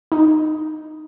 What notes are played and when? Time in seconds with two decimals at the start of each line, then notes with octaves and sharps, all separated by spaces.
0.12 D#4